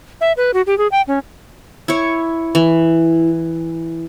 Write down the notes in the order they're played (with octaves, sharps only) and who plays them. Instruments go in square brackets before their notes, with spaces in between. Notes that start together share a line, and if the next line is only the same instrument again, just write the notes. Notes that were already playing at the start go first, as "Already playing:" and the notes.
[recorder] E5
B4
F#4
G4
G#4
G5
C#4
[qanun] E4 C#5
E3